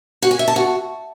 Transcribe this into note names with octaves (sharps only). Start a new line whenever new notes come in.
F#4
G#5
E5
A5
F#4